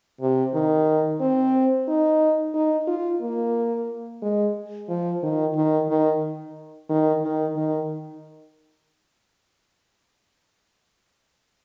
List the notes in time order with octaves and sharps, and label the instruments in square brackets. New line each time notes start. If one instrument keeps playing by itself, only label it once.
[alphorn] C3
D#3
C4
D#4
D#4
F4
A#3
G#3
F3
D#3
D#3
D#3
D#3
D#3
D#3